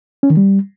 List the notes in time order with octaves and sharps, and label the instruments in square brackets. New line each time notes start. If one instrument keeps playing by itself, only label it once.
[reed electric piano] C#4
D#3
G3